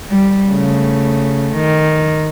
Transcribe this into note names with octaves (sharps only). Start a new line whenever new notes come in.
G3
C#3 A3
D#3